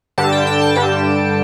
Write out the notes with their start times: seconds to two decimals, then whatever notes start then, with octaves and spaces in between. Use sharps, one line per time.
0.18 G2 D3 G3 A5
0.32 G5
0.47 G5
0.62 A5
0.76 G2 D3 G3 G5